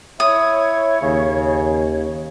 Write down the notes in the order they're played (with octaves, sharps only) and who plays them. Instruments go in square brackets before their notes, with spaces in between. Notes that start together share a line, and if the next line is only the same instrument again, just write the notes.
[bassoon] E4 [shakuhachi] C#5 [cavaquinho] D#6
[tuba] D#2 [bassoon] C#3